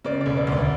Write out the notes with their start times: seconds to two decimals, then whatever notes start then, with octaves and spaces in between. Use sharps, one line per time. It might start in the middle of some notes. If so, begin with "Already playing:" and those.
0.05 C#3 D5
0.21 D5
0.26 E1
0.37 D5
0.47 D2
0.52 D5